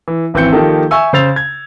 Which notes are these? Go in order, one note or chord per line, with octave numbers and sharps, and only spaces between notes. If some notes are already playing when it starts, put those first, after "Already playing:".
E3
G#1 E3 C4 G6 C#7
D#3 F3 A#3 D#4 G4 A4
E5 G#5 C#6 E6
C#3 C5 E6 A6 F7
G#6